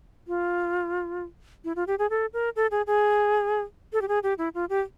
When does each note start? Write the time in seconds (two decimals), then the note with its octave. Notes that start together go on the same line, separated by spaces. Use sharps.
0.28 F4
1.64 E4
1.76 F4
1.87 G4
1.99 G#4
2.10 A4
2.33 A#4
2.56 A4
2.71 G#4
2.87 G#4
3.93 A4
4.02 G4
4.08 G#4
4.23 G4
4.38 E4
4.54 F4
4.69 G4